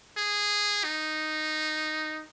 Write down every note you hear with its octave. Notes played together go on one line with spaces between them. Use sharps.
G#4
D#4